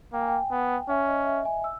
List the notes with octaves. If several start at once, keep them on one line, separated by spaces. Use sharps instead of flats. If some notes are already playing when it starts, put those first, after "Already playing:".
A#3 G5
G#5
G5
B3
C#4 E5
D#5
E5
G#5
E6